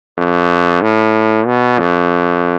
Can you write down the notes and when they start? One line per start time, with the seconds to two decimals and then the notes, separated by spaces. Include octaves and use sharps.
0.17 F2
0.82 A2
1.47 B2
1.79 F2